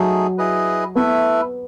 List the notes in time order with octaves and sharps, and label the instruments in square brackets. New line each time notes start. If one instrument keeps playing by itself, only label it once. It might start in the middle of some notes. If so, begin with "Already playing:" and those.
Already playing: [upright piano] F#3 [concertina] A3 D#4 G#4
[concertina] E4 G#4 B4 D#5
[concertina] A3 E4 B4 E5 [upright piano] B3